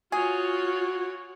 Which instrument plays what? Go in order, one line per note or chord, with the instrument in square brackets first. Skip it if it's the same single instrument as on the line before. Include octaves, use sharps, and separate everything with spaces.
[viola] F4 C#5 [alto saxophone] F#4 [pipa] G#4